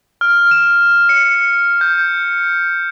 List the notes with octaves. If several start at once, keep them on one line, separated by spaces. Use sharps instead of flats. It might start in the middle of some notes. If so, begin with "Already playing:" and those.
F6
E7
C#7
G6